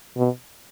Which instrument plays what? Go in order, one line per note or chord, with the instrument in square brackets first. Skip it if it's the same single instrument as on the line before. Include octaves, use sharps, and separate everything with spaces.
[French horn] B2